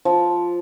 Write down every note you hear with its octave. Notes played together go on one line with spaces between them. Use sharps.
F3